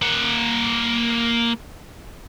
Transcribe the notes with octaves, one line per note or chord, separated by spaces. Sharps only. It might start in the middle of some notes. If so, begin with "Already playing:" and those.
A#3 F#5